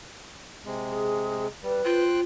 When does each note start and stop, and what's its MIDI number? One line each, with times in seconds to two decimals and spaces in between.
0.66 1.47 48
0.66 1.47 56
0.85 1.45 68
1.63 1.81 55
1.63 2.00 71
1.85 2.24 65
1.85 2.20 72
1.85 2.20 79
1.85 2.20 90